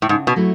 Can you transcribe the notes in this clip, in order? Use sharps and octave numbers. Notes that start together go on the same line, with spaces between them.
A2
G#2 C#3
B2
F#3 A3 E4